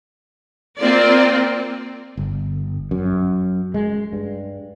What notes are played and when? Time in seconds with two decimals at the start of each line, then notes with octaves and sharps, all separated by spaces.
0.77 A#3 C4 F4 D5
2.17 G1
2.91 F#2
3.74 G#3
4.13 G2